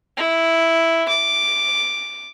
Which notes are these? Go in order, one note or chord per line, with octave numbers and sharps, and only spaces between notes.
E4
D6